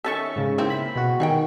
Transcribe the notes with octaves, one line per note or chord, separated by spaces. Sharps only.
D#3 C#4 A4 E5 A5 C#6
G#2 C#3
A#3 C4 E4
B5
B2 F#4
D#3 G#4 F#5 G5